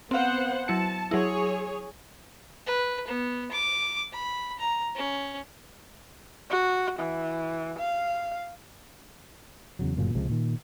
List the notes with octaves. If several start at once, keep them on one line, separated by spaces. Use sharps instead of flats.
B3 C4 C5 F5 F#5
F#3 E4 A5 C#7
F#3 E4 G#4 C#5
B4
B3
D6
B5
A#5
C#4
F#4
E3
F5
E2 C#3 F#3
G1 F#2 A#2 C#3
C#2 C3 F3 G#3
A#2 D#3